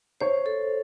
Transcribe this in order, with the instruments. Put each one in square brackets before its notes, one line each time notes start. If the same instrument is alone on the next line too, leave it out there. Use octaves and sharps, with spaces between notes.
[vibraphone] C5 [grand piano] C#5
[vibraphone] A4